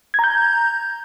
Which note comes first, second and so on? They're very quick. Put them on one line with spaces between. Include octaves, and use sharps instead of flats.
G#6 A#5 G6